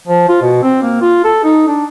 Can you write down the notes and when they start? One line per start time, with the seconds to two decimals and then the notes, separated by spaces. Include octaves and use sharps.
0.08 F3
0.29 F4
0.42 B2
0.63 C4
0.82 A#3
1.01 F4
1.24 A4
1.44 D#4
1.68 D4